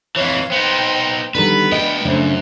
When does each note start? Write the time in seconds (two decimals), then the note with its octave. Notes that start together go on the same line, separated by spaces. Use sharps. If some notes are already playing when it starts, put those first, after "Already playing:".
0.16 F2 E3 C#5 F5
0.52 B3 D#4 C5 G5
1.35 D3 D#3 G3 B3 B4
1.72 D2 D4 D#5 G5
2.05 F#2 C#3 F#3 A3 D4 C5